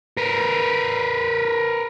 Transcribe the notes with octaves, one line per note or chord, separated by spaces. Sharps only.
A#4 B4